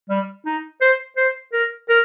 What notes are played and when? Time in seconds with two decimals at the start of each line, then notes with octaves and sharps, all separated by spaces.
0.10 G3
0.46 D#4
0.81 C5
1.17 C5
1.53 A#4
1.89 A#4